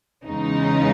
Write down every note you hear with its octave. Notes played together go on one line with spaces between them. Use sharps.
E2 C#3 G#3 D#4